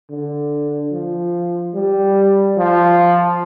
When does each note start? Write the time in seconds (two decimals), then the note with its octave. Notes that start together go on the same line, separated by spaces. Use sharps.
0.10 D3
0.92 F3
1.74 G3
2.57 F3